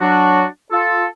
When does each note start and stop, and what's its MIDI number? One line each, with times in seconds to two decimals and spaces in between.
0.01 0.45 54
0.01 0.45 62
0.01 0.45 66
0.71 1.06 65
0.71 1.06 69